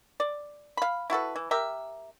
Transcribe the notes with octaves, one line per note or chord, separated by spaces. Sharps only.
D5
F5 B5
E4 F#4 A4 B4
E3
G4 A#4 E5